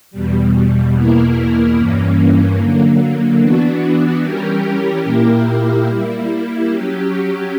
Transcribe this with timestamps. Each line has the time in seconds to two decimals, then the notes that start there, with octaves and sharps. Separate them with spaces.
0.11 E2 B2 G3
0.94 E2 B2 A#3 E4 A#4
1.76 G2 E3 A#3 C#4
2.58 D3 F#3 A#3
3.40 E3 B3 D4 F#4
4.22 E3 G3 C#4 G4 A#4
5.05 A#2 A#3 E4 G4 A#4
5.87 G3 A#3 E4
6.69 F#3 C#4 G4